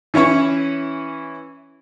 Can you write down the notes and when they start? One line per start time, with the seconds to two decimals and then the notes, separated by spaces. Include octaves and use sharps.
0.14 E3 C#4 E4 C#5